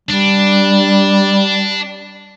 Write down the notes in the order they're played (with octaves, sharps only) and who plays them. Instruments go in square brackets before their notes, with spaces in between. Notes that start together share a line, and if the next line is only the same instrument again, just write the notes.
[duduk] G3 [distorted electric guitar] D4